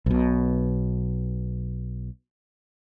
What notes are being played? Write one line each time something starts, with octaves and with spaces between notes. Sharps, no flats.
B1 B2